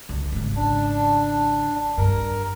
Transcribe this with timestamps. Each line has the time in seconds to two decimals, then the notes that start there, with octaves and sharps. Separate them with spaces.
0.09 C#2
0.32 G#1 C#3
0.56 D4
1.98 G2 A#4